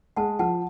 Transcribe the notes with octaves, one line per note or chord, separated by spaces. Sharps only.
G#3 F#5 A5
F3 F#5 A5